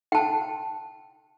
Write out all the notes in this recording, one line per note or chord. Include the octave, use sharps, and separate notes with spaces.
G5 A5